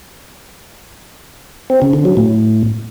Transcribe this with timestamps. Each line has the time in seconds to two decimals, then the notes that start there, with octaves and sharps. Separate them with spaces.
1.70 C4
1.82 C#3
1.93 D3
2.05 F#3
2.17 A2